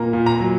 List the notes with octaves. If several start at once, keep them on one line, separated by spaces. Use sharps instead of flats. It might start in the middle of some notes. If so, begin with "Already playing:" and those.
Already playing: A#2 A#3 A#5
A#2
A#5
F#3